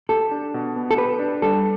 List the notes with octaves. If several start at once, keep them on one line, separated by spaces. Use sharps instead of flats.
G4 A4
D4
B2
B3
A4
G4 B4
D4
G3 A4